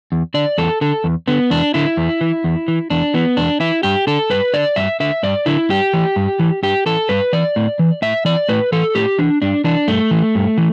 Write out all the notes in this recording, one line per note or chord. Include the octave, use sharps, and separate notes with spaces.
E2
D3 D5
E2 A4
D3 A4
E2
D3 B3
E2 D4
D3 E4
E2
E3
E2
E3
E2 D4
E3 B3
E2 D4
E3 E4
G2 G4
D3 A4
G2 B4
D3 D5
G2 E5
D3 E5
G2 D5
D3 E4
G2 G4
E3
G2
E3
G2 G4
E3 A4
G2 B4
E3 D5
A2
E3
A2 E5
E3 D5
A2 B4
E3 A4
A2 G4
E3 D4
G2 D4
E3 D4
G2 A3
E3
G2
E3